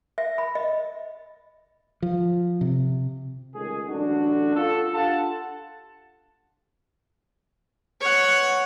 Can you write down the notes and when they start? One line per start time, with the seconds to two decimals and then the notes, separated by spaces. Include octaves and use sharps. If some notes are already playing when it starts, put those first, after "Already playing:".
0.18 E5
0.38 B5
0.55 D#5
2.02 F3
2.61 C3
3.55 C#2 D#3 A3 G#4
3.88 A1 F#2 A3 D4 F#4
4.55 F4 A4
4.93 D4 F4 G4 A4 F#5 A5
8.01 C#5 F#5